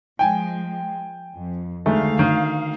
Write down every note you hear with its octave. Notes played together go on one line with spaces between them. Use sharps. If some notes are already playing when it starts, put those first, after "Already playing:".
F3 G#3 G5 G#5
F2
D2 D#3 G#3 A3 F5
D#3